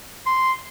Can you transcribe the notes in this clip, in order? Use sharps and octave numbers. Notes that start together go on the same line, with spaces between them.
C6